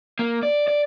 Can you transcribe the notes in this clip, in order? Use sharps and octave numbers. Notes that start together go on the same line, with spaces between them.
A#3
D5
D5